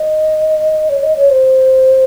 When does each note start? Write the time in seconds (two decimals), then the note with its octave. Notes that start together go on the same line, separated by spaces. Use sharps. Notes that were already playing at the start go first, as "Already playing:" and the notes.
Already playing: D#5
0.89 C#5
1.03 D#5
1.16 C#5
1.30 C5